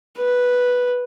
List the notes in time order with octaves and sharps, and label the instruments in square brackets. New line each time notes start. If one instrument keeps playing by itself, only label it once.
[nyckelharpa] B4